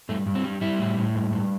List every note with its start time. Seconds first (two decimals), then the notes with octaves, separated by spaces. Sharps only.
0.09 G2 A3
0.27 G2
0.35 C4
0.44 G3
0.61 G3 E4
0.79 A2
0.97 A2
1.15 G2
1.33 G2